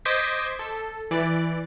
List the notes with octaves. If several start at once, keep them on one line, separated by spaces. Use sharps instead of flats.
C5 D#5 D6 G6 G#6 B6
A4
E3 D5